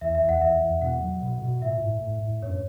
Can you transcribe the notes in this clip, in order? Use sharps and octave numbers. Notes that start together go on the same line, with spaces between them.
E2 E5
E5
E2
F#5
E2 E5
E2
B2 F#5
F#3
B2
B2
A2 E5
A2
A2
A2
F#2 C#5